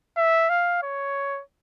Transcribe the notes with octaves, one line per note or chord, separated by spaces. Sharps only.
E5
F5
C#5